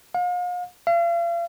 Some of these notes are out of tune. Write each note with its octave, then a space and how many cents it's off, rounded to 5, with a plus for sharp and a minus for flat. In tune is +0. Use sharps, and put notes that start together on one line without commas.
F5 +40
F5 -40